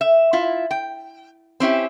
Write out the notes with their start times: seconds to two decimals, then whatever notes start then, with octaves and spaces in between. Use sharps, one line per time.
0.01 E5
0.33 E4 F4
0.71 G5
1.60 C4 C#4 E4 G4